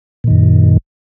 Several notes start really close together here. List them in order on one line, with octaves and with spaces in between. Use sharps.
A#2 D#3 F#2